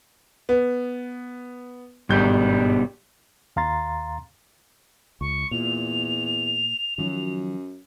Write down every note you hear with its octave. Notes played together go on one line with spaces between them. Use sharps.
B3
G#1 G2 B2 G3 G6
D#2 F5 A#5 C6 A6
C#2 C#6
E2 A#2 F7
F#2 D#3 F3 F#3